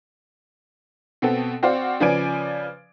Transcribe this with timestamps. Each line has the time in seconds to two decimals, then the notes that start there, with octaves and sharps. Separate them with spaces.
1.22 B2 B3 C4 A4
1.63 C4 F#4 C5 D5 F5
2.00 C#3 F3 B4 D5 G#5 D7